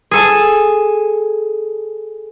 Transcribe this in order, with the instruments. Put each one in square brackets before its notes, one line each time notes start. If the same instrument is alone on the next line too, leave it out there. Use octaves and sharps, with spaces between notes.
[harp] G#4 A4 G#5